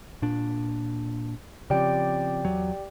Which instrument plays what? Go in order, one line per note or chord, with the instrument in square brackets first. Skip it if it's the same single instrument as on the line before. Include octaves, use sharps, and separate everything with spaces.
[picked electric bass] A#2 D4
[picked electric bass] C#3 F3 C4 [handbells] G4 D5 G5
[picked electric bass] E2 F#3